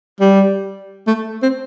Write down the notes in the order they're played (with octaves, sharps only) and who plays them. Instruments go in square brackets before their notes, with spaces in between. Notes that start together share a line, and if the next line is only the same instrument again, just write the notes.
[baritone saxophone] G3
A3
C4